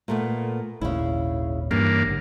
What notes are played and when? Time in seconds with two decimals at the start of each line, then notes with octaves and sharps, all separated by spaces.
0.08 A#2 A3 B3
0.81 G#1 D#2 A#2 C#3 E4
1.71 G2 E3 A#3 C#4
2.05 A1 D3